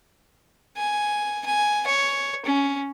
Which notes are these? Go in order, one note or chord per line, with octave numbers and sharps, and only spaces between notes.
G#5
G#5
C#5
C#4